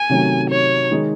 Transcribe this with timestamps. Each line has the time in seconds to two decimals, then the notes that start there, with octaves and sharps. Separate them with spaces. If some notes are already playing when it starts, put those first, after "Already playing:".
Already playing: G#5
0.09 C3 D#3 F#3 A3 C#4
0.50 C#5
0.91 D#3 G#3 D#4